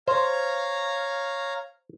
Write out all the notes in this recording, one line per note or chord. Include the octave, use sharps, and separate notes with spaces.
C5 C#5 F5 A#5